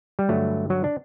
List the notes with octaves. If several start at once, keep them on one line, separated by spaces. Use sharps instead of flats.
G3
G2 D3 F#3 A3
F#3
D4